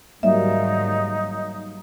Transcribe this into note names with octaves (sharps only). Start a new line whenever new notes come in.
G#2 D#3 F#3 G3 A#3 D#4 E5